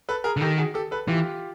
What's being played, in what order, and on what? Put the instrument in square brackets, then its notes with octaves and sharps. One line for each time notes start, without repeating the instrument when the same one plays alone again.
[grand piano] A4 B4
G#4 A#4
[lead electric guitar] D3
[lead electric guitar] D#3 [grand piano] G4 A4
[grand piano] F#4 G#4
G4 A4
A4 B4
[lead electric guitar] E3 [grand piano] F4 G4